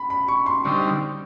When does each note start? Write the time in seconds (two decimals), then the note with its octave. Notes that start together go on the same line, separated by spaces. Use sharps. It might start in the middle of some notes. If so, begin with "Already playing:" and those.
Already playing: B5
0.10 B5
0.28 C#6
0.46 C6
0.64 D3 G3 C4 D#4 C#6